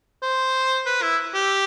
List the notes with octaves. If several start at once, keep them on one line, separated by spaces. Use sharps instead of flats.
C5
B4
E4
G4